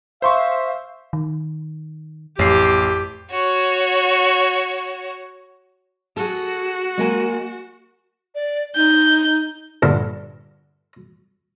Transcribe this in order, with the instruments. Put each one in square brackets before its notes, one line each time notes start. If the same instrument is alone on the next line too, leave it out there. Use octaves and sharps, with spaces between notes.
[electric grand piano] C5 C6 C#6 [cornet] E5 [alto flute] F5
[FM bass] D#3
[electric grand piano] A1 C7 [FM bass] F2 [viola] G4
[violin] F#4 C#5
[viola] F#4 [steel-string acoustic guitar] G#4 A4
[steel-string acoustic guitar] G#3 A#3 G#5
[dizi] D5
[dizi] D#4 [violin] G6
[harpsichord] G2 A#2 D3